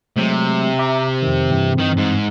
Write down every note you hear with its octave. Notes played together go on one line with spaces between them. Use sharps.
C3 F#3 G#3 A3
E5 A#5 D6
F2 D#3
G2 E3 C4
D#3
G#2